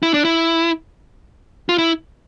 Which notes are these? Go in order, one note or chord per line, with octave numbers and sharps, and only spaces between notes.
E4
D4
E4
F4
E4